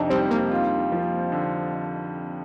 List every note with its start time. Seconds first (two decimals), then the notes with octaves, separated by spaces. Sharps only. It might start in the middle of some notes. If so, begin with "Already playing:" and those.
Already playing: F2 C3 D4 D#4
0.10 G3 C4
0.30 A#3
0.52 F4
0.92 F3
1.32 D3